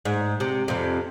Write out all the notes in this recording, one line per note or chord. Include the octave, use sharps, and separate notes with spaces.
G#2
C3
F2 C3